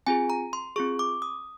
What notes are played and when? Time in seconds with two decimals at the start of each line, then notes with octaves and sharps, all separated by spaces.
0.07 C4 F4 G#4 G#5
0.30 A#5
0.53 C6
0.76 C4 F4 G#4 C#6
0.99 D6
1.22 D#6